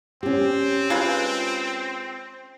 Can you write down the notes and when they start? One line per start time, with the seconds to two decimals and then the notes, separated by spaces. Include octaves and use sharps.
0.23 C4 C#4 G4
0.90 G#3 F4 B4